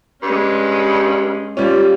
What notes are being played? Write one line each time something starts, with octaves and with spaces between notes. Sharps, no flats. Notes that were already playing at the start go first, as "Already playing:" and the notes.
G2 G#3 C#4
G3 C#4 F4 G4